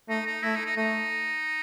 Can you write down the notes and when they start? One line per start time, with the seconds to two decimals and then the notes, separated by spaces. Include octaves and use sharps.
0.09 A3 D#4
0.26 D#4
0.43 A3 E4
0.55 D#4
0.66 D#4
0.77 A3 D#4